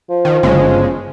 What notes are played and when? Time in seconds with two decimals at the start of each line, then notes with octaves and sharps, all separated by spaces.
0.10 F3
0.25 D#3
0.43 G1 C#3 G#3